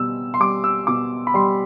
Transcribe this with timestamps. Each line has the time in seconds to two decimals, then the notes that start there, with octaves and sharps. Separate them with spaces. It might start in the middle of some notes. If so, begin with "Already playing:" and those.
Already playing: B2 G3 E6
0.34 C6
0.40 G3 D6
0.64 E6
0.87 B2 D6
1.27 B5
1.34 G3 C6